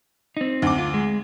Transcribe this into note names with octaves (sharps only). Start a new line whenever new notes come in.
C4 D#4
D2 D6
F4
G#3